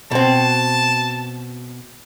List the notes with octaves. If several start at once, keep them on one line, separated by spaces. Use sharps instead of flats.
B2 C4 A5